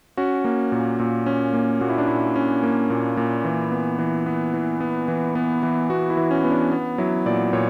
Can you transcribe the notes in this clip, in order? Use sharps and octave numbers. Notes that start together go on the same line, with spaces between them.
C#4 F#4
A#3
A#2
A#2
C#4
A#3
A#2 F#4
E4
D4
A#2 E4
C#4
A#3
A#2
A#2
E3
B3
E3
B3
E3
B3
E3
B3
E3
B3 F#4
E4
E3
C#4
B3
D4
B3
F#3 E4
A#2 D5
A#2 C#5